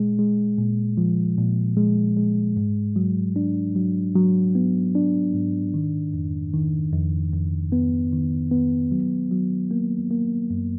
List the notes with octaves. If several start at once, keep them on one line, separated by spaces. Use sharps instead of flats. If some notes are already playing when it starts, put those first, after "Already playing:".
Already playing: A#2 G#3
G#3
A#2
F3
A#2
G#3
G#3
G#2
F#3
D4
F#3
F#3
B3
D4
G#2
D#3
F2
D#3
F2
F2
B3
D#3
B3
F#3
F#3
A#3
A#3
F#2